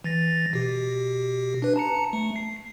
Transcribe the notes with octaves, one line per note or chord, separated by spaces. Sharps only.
E3 A6 A#6
B2 G4
D4 B4
A5 A#5 C#7
A3
C7